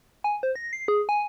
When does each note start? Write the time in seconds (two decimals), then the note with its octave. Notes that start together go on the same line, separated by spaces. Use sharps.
0.24 G#5
0.43 C5
0.56 A#6
0.73 C7
0.88 G#4
1.09 G#5